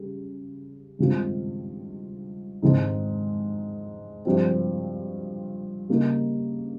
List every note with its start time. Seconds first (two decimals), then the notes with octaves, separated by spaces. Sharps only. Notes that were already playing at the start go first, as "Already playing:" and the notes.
Already playing: C#3 G3
0.99 G2 D#3 G#3 C4 F4
2.62 G#2 D#3 G#3 C4 D#4
4.25 G2 F3 C4
5.89 C#3 G3 A#3 D#4